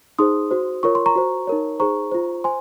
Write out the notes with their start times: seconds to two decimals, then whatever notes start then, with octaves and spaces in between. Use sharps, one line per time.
0.19 D#4 G#4 C5 C6 D#6
0.51 F#4 C5
0.83 F4 A#4 C#5 C#6
0.95 C6
1.06 A#5 C#6
1.16 F#4 C5
1.47 D#4 A#4 C#5
1.80 D#4 G#4 C5 A#5 C#6
2.12 F4 C5
2.44 C5 G#5 C6